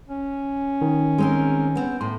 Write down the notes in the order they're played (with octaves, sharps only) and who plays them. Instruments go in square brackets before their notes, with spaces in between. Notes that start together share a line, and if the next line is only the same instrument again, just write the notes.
[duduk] C#4
[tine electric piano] D#3
[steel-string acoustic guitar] G#3 C4 A#4
B3 C4
[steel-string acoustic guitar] A2 [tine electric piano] C6